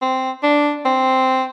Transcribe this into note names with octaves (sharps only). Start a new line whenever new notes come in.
C4
D4
C4